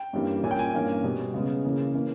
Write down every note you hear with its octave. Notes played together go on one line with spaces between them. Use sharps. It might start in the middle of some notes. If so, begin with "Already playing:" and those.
Already playing: G5
G2 E3 G3 A#3 C#4
A#2 A#3 C#4 G#5
G5
G#5
G2 E3 A#3 C#4
B2 G3 B3
C#3 G#3 B3
C#3 E3 A#3
E3 A#3 C#4